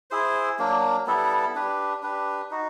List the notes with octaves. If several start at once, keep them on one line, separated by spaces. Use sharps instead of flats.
E4 G#4 C5
F#3 A#3 D4
G3 B3 E4 A4
D4 G4 B4
D4 G4 B4
D#4 F#4